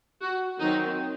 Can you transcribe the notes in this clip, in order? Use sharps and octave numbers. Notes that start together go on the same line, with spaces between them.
F#4
D#3 F#3 C4 D#4